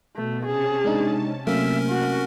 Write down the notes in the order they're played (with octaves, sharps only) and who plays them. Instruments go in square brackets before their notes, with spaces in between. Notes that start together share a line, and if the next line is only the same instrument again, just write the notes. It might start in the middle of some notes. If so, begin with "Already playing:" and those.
[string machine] B2 [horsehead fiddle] A3
[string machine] C3 C#4 A5 [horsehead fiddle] G#4
[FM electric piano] G#3 D4 D#4
[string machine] C3 [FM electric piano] F#3 A3 A#3 [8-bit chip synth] C#4 A#4 [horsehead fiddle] E5
[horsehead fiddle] F#4